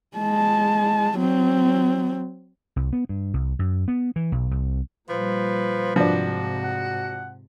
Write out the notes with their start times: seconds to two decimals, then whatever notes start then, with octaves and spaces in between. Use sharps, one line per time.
0.17 G#3 A5
1.19 F#3 C4
2.76 C2
2.93 B3
3.09 G2
3.34 C2
3.59 F#2
3.88 B3
4.16 E3
4.32 B1
4.51 C2
5.09 A#2 F3 G3 B4
5.96 G#2 C3 F3 D4 F#4
6.63 F#5